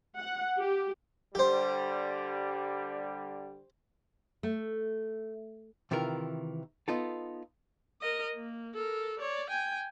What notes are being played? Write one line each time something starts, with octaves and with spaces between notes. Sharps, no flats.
F#5
G4
D3 G3 G4 C5
A3
C3 D#3 E3 F4 A#4
B3 D#4 F4 A4
A#4 D#5
A#3
A4 A#4
C#5 D5
G5 G#5